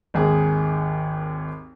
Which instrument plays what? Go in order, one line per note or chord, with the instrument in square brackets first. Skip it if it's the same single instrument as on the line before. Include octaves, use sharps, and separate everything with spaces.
[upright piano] G#1 D#2 G#4